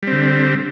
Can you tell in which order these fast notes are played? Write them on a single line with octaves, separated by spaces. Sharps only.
G3 C4 D3